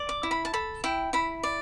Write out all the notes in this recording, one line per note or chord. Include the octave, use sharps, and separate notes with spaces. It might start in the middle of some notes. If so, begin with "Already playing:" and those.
Already playing: D5
D6
E4
B5
A5
A4 B5
E4 G5
E4 B5
D5